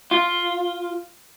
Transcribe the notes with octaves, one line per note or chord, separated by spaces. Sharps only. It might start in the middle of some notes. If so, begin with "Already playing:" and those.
F4